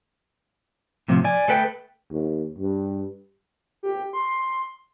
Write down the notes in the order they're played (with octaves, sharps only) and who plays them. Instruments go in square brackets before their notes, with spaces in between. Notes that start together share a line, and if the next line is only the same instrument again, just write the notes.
[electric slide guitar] A2 C3 F3
D5 G#5
A3 A4 B4 G5
[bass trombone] D#2
G2
[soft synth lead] G4
C6